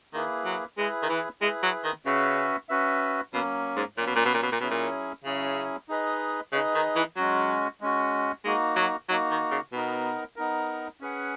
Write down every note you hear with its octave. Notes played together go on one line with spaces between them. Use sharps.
D#3 A#3 E4 G#4 B4
F#3
G#3 E4 G#4 B4
D#3
E3
G#3 E4 G#4 B4
F#3
D#3
C#3 C#4 F#4 B4 E5
C#4 F#4 B4 E5
B2 F#3 A#3 C#4
G#2
A#2 F#3 A#3 C#4
B2
A#2
B2
A#2
B2
A#2
B2 F#3 C#4 E4 G#4
A#2
C#3 F#3 C#4 E4 G#4
D#4 G#4 B4 D#5
C#3 D#4 G#4 B4 D#5
D#3
E3
F#3 G#3 C#4 F#4
G#3 C#4 F#4
G#3 A#3 D#4 F#4
F#3
F#3 A#3 D#4 F#4
D#3
C#3
B2 B3 D#4 A#4
B3 D#4 A#4
C#4 G#4 B4 F#5